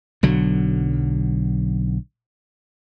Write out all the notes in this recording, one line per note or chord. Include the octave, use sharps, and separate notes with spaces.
B1 D3 F#3